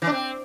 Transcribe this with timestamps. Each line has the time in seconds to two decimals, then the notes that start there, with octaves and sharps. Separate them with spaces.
0.02 E3
0.07 D4
0.12 C4